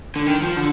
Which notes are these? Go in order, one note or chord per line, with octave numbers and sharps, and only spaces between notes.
D3
D#3
F3
D3